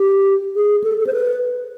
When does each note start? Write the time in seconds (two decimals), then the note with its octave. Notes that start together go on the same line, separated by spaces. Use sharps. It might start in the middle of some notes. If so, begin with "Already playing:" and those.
Already playing: G4
0.56 G#4
0.84 A4
0.99 A4
1.07 C5
1.13 B4